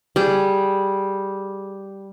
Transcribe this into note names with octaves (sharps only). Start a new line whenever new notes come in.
G3 G#4